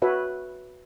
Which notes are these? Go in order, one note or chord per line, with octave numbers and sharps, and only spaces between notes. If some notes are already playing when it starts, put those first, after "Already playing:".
F#4 B4 C#5 E5